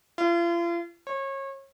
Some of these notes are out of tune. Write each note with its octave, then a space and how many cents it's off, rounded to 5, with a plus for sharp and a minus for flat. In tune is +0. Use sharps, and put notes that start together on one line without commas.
F4 -40
C#5 -30